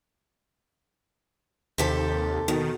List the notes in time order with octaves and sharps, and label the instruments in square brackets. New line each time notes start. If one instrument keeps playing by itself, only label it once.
[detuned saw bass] D#2 [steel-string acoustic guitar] C3 G4 A4
[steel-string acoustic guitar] B2 [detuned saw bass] D#3